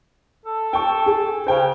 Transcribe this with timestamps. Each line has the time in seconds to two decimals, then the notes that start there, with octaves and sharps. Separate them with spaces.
0.46 A4
0.73 G5 C#6
1.06 G#4
1.47 C#3 C5 G5